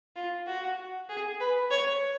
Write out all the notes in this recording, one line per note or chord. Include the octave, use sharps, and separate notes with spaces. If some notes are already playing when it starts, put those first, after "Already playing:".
F4
F#4
G#4
B4
C#5